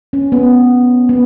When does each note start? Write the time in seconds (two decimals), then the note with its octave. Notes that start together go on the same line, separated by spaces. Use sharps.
0.13 C#4
0.32 B3
1.09 B3